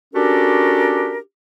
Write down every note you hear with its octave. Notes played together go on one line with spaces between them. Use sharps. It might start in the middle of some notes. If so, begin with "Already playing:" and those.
C#4 D4 F#4 G4 A4 A#4